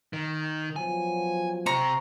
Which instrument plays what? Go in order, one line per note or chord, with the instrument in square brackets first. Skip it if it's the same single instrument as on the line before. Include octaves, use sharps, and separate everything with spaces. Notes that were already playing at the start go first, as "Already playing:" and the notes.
[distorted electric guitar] D#3
[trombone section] B2 F3 F#3 [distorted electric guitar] G#5
[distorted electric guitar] C3 C4 [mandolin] A#5 C#6